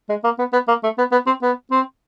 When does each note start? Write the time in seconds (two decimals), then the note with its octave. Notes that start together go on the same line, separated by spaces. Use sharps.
0.09 G#3
0.24 A#3
0.39 B3
0.53 B3
0.68 A#3
0.83 A3
0.98 B3
1.12 B3
1.26 C4
1.42 B3
1.71 C4